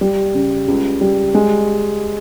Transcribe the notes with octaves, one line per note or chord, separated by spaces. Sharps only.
G3
C#3
C#2
G3
G#3